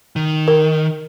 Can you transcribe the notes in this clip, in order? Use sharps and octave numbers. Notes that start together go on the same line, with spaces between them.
D#3
A#4